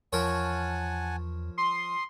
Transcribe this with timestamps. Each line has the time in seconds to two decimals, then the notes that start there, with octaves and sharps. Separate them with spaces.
0.13 E2 F3 A#4 C#5 F#5 G#5 A5
1.58 C6 D#6